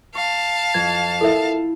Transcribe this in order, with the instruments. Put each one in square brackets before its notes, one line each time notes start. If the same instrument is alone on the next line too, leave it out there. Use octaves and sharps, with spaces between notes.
[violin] F5 A5 [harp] C#6
[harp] F2 [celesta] G#6
[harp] E4 [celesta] A4 A#4 E5